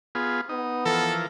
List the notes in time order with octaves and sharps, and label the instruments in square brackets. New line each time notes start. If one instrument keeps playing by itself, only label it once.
[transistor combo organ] B3 F4 G#4
[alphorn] B3 [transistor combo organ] D#4
[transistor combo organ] E3 F3 A#4 [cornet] A4